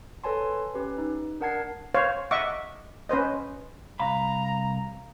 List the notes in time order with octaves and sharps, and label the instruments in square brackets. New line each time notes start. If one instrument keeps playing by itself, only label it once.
[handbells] A4 B4 C#5 G#5 A5 C6
C#4 G4 B4
D#4
D4 A#4 F#5 A5 G#6 C7
[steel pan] C5 C#5 F5
D#5 E5 F#5 C#6 D6
C#4 B4 C5 D#5
[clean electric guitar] C2 F5 B5 [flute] A#5